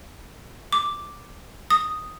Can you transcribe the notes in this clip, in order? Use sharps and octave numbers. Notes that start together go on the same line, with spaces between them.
D6
D#6